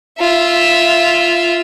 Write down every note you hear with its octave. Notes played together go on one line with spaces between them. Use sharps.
F4 E5